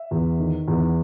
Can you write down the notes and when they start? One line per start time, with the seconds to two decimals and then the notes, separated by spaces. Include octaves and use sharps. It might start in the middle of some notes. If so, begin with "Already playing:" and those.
Already playing: E5
0.11 E2
0.40 D#3
0.68 E2